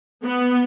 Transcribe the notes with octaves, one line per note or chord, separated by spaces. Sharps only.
B3